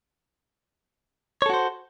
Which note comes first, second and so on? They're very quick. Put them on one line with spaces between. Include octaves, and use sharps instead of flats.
C#5 A4 F#4 C5